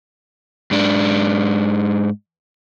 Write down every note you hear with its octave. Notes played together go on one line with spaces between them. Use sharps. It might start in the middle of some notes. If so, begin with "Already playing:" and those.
G#2 D4